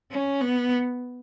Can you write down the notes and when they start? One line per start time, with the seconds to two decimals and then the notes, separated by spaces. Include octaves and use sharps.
0.11 C#4
0.41 B3